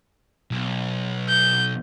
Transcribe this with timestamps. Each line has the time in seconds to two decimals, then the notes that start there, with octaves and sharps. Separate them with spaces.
0.51 B1
1.29 G6